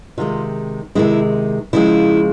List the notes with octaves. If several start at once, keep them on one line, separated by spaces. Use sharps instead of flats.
C3 D#3 G#3 F4
C3 D#3 G#3 E4
C#3 F3 G#3 E4